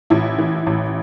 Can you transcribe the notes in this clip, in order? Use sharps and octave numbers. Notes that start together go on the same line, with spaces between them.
A1 E4
E3
A1